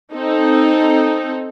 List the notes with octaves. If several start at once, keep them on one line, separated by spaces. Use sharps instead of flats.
C4 D#4 A4